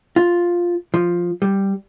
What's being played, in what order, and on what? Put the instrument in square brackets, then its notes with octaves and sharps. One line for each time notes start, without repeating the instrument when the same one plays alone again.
[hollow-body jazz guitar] F4
F3
G3